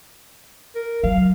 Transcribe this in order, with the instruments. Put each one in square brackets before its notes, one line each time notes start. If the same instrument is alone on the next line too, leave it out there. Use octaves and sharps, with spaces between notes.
[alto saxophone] A#4
[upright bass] F#3 [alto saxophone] F5